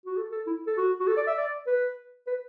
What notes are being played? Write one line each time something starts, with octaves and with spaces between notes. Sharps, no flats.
F#4
A4
A4
E4
A4
F#4
F#4
A4
D5
E5
D5
B4
B4